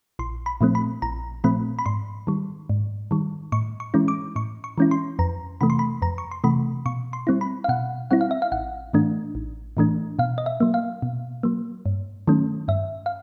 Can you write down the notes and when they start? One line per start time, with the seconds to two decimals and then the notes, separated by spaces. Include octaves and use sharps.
0.19 A#1 C6
0.46 B5
0.61 A#2 F3 A3 C4
0.75 B5
1.02 A#1 A#5
1.44 A#2 F3 A3 C4 B5
1.79 B5
1.86 G#2 C6
2.27 D#3 G3
2.69 G#2
3.11 D#3 G3
3.52 A2 C#6
3.80 C#6
3.94 E3 G#3 C#4 E4
4.08 D6
4.36 A2 C#6
4.64 C#6
4.78 E3 G#3 C#4 E4
4.91 C6
5.19 F2 A#5
5.61 C3 E3 A3 B5
5.70 C6
5.79 B5
6.02 F2 A#5
6.18 C#6
6.31 C6
6.44 C3 E3 A3 B5
6.86 B2 C#6
7.13 C6
7.27 G3 C4 E4
7.41 B5
7.64 F5
7.69 B2 F#5
8.11 G3 C4 E4 F#5
8.21 F5
8.31 E5
8.42 F5
8.52 A1 F#5
8.93 A2 E3 A3 D4
9.35 A1
9.77 A2 E3 A3 D4
10.19 B2 F5
10.38 D#5
10.46 E5
10.60 F#3 A#3
10.74 F5
11.02 B2
11.43 F#3 A#3
11.86 G2
12.27 D#3 F#3 A3 C#4
12.68 G2 E5
13.06 F5